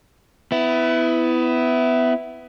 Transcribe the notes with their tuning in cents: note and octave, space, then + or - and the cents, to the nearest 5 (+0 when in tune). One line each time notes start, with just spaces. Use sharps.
B3 +25 E4 +0